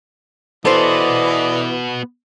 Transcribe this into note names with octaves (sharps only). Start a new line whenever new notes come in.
E3 B3 F#4 A4 C5 D5 D#5